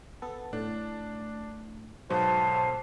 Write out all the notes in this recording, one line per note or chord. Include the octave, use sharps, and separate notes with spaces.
B3 A4
A2 D4
G#2 B2 F#3 B3 A4 C5 F5 A5